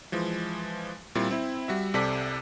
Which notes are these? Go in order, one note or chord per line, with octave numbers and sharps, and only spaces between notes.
E3 F3 G#3
A#2 G3 C4 E4
C4 E4
G3 F#4 E5
C2 C3 A4 D5 B6